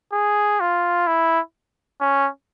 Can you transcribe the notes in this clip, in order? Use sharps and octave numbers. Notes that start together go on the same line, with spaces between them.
G#4
F4
E4
C#4